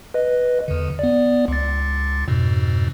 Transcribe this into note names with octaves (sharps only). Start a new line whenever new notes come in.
B4 D#5
E2 D3
B3 D5
C#2 A6
F2 G#2 B2